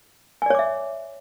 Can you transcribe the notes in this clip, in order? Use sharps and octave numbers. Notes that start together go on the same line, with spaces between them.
C#5 D5 E5 G#5 D6